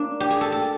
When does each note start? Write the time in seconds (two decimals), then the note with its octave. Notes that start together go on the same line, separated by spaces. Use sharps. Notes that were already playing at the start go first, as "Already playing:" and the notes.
Already playing: A#3 D4
0.20 G4
0.30 G#4
0.41 A4
0.52 A4